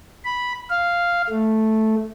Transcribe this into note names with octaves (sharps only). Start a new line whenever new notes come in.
B5
F5
A3